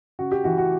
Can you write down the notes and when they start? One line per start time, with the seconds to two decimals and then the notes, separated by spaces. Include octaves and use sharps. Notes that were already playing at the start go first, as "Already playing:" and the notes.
0.19 C#3 F#4
0.32 G4
0.44 E3 F#4
0.58 F#4